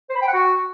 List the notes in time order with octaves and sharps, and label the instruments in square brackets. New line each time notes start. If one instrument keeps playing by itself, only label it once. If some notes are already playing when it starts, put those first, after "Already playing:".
[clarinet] C5
B5
G5
F#5
F#4